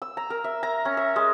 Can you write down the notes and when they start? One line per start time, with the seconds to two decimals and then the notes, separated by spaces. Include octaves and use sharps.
0.02 E6
0.17 A#5
0.30 A#4
0.44 E5
0.63 A#5
0.85 C#4
0.97 E5
1.16 G#3